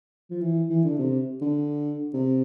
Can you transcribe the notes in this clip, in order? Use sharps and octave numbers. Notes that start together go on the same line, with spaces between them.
F3
E3
E3
D3
C3
D3
C3